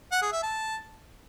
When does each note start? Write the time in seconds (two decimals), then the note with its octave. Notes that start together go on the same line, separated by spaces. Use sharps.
0.12 F#5
0.22 G#4
0.32 E5
0.43 A5